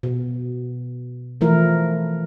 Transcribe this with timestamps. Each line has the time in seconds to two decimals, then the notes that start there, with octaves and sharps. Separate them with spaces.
0.03 B2
1.41 E3 F3 A3 E4 A#4